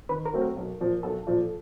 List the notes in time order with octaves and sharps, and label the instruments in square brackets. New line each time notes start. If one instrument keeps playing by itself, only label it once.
[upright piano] D#3 [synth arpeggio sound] B4
[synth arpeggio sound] A#4
[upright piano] F#3 A3 C4
[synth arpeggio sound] A#4
[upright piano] B1
A#2 F3
[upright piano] B1 [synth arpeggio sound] A4
[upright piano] A#2 F3